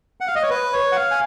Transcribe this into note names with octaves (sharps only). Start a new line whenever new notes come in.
F#5
F5
D#5
C#5
B4
C#5
F#5
F5
G#5